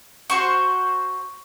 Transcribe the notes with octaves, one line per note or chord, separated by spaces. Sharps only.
F#4 C5 C#6